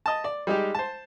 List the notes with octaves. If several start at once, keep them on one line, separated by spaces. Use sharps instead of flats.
D#5 A5
D5
G3 G#3 D#4 G4
C5 A5